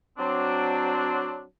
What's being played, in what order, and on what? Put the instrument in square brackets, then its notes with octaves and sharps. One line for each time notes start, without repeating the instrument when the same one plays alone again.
[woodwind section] F#3 C4 D4